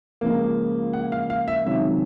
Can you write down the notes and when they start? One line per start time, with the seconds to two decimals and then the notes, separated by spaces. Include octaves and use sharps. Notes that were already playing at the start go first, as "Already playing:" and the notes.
0.21 C#2 C#3 F3 A#3
0.93 F#5
1.12 F5
1.30 F5
1.48 E5
1.66 C#2 C3 D#3 F#3 E5